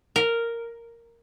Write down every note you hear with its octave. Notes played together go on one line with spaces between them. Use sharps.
A#4